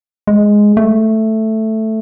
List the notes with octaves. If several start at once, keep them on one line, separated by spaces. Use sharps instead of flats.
G#3
A3